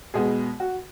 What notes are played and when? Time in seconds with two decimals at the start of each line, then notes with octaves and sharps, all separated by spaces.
0.14 B2 G#3 B3 G#4
0.60 F#4